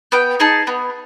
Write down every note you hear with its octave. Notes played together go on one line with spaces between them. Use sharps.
B3 G5
D#4 G#4 A5
B3